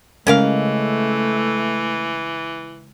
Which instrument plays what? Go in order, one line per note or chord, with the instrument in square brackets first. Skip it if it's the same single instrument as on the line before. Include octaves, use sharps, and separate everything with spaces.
[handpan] C#3 G#3 [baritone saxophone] E3 [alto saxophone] A3 [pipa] C#4 A#4 F5